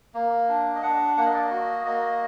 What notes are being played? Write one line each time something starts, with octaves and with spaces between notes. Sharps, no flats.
A#3
D4
D#5
D4 F#5
A#3 F#5
D#5
D5
D#5
F#4
A#3 D#5